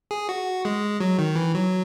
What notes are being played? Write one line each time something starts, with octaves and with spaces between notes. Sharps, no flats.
G#4
F#4
G#3
F#3
D#3
E3
F#3